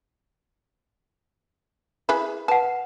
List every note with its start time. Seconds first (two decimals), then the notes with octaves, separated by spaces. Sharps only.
2.09 E4 G#4 B4
2.48 B4 F#5 A5